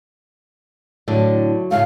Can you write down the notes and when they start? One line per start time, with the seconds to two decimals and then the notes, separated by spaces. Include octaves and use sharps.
1.08 A2 D3 F#3
1.71 A2 C#3 A3 F5